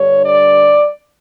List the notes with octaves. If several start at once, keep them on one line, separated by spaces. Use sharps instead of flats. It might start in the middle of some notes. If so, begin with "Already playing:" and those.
Already playing: G2 D3 G3 C#5
D5